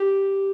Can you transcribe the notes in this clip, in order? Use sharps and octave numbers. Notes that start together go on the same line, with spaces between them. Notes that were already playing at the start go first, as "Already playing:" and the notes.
Already playing: G4